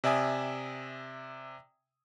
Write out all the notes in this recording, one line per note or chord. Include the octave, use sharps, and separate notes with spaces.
C3 D5 E5 G#5 D#6